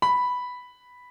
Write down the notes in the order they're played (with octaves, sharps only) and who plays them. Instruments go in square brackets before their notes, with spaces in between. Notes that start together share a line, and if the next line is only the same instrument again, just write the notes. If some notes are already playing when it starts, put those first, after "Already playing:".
[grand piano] B5